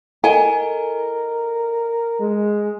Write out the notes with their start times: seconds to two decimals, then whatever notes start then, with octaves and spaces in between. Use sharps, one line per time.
0.24 E4 A4 A#4 D#5 G#5
2.20 G#3